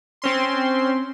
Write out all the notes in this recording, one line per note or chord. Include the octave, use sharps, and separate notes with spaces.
C4 C#4 C6